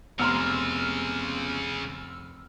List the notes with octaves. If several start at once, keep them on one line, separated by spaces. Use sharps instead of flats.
F1 C#3 G#3 B3 A#5 C6 E6 F6